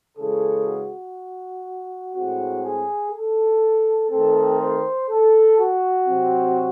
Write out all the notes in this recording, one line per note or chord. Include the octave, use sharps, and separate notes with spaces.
C#3 E3 G#3 A4
F#4
A2 G#3 C4 F#4
G#4
A4
D#3 A3 C4 A4
C5
A4
F#4
C3 F#3 C4